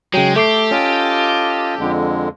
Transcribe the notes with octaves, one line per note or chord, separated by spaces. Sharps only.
C#3 F#3 G#3 G5
A3 G4 A4 D6 C7
C#4 F4 D#5
F2 D3 G#3